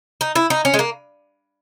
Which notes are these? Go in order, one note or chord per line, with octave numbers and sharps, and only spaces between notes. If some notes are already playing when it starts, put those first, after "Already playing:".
D#4
E4
D#4
C#4
G#3
A#3